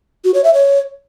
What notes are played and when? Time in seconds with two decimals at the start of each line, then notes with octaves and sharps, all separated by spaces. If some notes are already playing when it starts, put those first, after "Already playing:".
0.24 F#4
0.34 C#5
0.44 E5
0.54 C#5